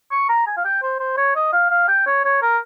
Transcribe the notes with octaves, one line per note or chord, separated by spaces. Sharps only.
C#6
A#5
G#5
F5
G5
C5
C5
C#5
D#5
F5
F5
G5
C#5
C#5
A#4